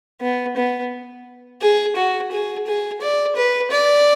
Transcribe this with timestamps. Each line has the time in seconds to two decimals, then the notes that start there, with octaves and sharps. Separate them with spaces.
0.21 B3
0.57 B3
1.61 G#4
1.96 F#4
2.32 G#4
2.67 G#4
3.01 D5
3.36 B4
3.71 D5